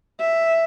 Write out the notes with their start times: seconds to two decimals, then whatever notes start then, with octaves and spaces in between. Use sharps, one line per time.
0.20 E5